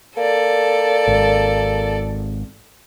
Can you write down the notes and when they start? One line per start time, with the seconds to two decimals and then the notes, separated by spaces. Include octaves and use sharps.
0.17 A#3 A4 D5
1.07 G#1